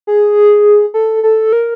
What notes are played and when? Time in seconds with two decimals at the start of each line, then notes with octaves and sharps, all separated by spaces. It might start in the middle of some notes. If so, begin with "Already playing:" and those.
0.07 G#4
0.94 A4
1.23 A4
1.53 A#4